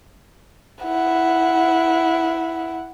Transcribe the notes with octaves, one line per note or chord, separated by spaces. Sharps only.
E4 F#5